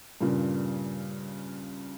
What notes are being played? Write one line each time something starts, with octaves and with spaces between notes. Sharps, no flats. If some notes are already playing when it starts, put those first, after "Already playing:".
G2 A#2 C#3